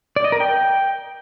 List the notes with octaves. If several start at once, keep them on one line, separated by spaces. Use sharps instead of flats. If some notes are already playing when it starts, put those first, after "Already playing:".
D5
D#5
A#4
G5